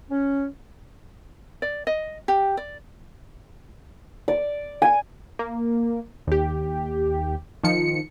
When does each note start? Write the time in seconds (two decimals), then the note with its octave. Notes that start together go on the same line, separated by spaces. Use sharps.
0.10 C#4
1.62 D5
1.87 D#5
2.28 G4
2.57 D5
4.28 D5
4.82 G#5
5.39 A#3
6.27 D#2 G4
7.64 D#3 F3 C#7